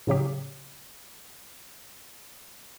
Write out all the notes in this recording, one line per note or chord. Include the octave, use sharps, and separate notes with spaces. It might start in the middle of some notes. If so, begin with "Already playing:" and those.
A2 C#3 F#3 G4